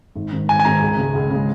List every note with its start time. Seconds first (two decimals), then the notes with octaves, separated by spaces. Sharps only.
0.15 G#1
0.32 G#2 D#3
0.48 G#1 G#5
0.60 G#5
0.65 G#2 D#3 A#5
0.81 C#2
0.97 C#3 G#3
1.14 C#2
1.30 C#3 G#3